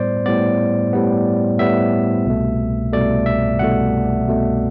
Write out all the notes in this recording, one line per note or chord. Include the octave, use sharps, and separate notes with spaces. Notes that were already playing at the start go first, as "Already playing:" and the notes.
Already playing: A2 G3 B3 C5 D5
A2 G3 B3 D5
A2 G3 B3
A2 G3 B3 E5
C2 B2 A3
C2 B2 A3 D5
E5
C2 B2 A3 F#5
C2 B2 A3